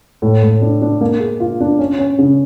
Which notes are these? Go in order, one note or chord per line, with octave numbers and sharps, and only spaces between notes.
A2
A2
D4
D4
A#3
G#4
F4
D4
C#4
C#4
C#3